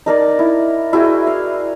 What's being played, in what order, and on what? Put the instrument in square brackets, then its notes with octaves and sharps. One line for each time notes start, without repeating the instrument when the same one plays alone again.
[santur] D#4 A#4 D5
E4
E4 F#4 G#4 G5
F5